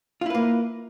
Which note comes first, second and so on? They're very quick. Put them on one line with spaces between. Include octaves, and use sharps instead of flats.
F4 E4 B4 A#3